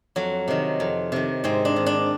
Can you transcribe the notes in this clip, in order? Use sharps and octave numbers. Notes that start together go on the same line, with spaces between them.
F2 F#3
C3 D#3
F2
C3 D#3
G#2 C4
D4
D#3
D4